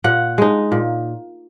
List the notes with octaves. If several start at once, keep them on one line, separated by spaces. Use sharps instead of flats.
A#2 F#5
G#3 D#4
A#2